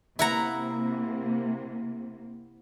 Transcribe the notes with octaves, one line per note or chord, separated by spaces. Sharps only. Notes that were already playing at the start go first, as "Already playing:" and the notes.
C3 A#3 E4 F#5 A#5